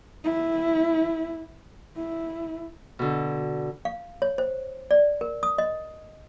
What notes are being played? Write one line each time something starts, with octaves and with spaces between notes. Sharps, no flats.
E4
E4
B2 D3
F5
C#5
C5
D5
A#4
D#6
D#5